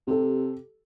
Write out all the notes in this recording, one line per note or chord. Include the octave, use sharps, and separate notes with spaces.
C3 G4 A4